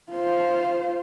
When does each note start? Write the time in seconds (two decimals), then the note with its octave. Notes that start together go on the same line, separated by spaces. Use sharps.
0.11 F4 C5